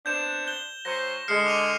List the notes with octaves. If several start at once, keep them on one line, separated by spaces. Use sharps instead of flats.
B3 C4 D4 G6 E7
G6 G7
F#3 C#4 C5 A#6
D3 G#3 F6 C7 C#7
D6 D#7 F7